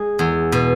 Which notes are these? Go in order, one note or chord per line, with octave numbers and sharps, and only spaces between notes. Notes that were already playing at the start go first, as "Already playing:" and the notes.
Already playing: G#3 G#4
E2
B2